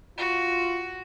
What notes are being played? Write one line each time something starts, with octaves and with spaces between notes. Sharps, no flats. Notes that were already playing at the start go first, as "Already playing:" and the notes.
F4 F#4